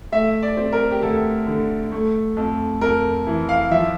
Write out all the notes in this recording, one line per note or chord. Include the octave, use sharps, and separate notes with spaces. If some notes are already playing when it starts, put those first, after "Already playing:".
A3 E5
D5
C4
A#4
G4
D2 A4
D3
A3
F2
F2 A#4
E3
F5
F3 E5